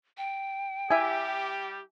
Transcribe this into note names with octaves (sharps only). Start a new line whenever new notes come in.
G5
G3 E4 G4 E5 G#5